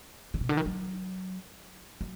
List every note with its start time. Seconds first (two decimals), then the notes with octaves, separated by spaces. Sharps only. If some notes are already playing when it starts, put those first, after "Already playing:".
0.34 D3
0.41 B2
0.49 D3
0.57 D#3
0.66 F#3
2.01 F#3